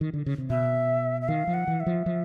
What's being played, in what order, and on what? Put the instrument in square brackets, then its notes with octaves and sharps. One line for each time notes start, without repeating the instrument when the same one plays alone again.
[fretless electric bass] D#3
D3
C#3
C3
[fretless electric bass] B2 [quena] E5
[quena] E5
[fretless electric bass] D#3 [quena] F5
[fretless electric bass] F3
[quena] F#5
[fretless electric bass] E3
[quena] E5
[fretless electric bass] F3
F3